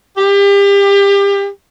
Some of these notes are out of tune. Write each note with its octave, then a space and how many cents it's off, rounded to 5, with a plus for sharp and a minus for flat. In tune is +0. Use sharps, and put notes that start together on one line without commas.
G4 +30